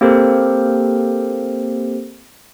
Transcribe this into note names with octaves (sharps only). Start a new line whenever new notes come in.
A#3 C4 G4 A4 A#4 C5